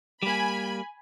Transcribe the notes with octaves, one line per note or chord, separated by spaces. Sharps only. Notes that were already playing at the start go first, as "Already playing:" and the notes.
G3 A#3 G#5 B5